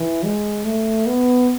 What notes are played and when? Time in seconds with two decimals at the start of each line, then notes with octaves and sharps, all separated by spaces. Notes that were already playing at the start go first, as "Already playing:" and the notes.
Already playing: E3
0.25 G#3
0.65 A3
1.06 B3